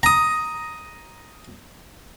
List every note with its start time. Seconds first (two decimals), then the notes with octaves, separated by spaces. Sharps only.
0.03 A#5 D#6